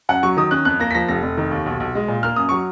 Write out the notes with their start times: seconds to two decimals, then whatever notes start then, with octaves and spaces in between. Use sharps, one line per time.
0.09 F#2 F#5
0.23 F#3 C#6
0.37 D#3 D#6
0.51 C#4 F#6
0.65 F2 F#6
0.80 A#3 A#6
0.91 B6
0.95 F3 A#6
1.09 F1 A#6
1.23 F1
1.38 D#3
1.51 D#2
1.66 B1
1.80 B1
1.95 G#3
2.08 A#2
2.23 A#3 F6
2.36 F#2 D#6
2.49 F#3 C#6